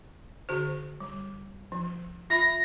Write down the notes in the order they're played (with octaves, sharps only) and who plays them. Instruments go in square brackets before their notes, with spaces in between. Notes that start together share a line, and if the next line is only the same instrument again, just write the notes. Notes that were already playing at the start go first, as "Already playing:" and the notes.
[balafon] D3 F#4 C5
G3
F3
[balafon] F4 E5 B5 [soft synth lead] A#6